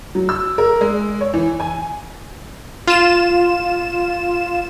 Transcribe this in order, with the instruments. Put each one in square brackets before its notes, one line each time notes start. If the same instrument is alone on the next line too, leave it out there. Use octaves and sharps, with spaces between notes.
[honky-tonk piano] F#3
E6
A#4
G#3
C#5
E3
G#5
[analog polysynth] F4 E7